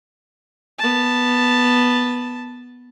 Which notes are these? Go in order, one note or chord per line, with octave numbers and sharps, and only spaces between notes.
B3 A5